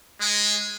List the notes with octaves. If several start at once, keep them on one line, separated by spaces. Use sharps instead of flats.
G#3